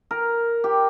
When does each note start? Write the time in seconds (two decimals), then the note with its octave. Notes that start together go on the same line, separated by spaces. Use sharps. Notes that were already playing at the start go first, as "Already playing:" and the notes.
0.11 A#4
0.64 G4